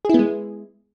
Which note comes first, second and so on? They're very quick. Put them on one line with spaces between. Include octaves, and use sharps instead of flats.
G#4 E4 B3 G#3